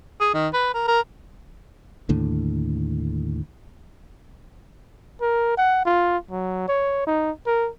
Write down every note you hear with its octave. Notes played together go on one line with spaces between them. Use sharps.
G#4
D#3
B4
A#4
A#4
D#2 A2 D3
A#4
F#5
F4
F#3
C#5
D#4
A#4